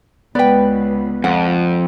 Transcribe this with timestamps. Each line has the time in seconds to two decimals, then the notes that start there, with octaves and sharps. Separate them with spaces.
0.35 C#2 B3 B4 D5 G5
1.24 F2 F#5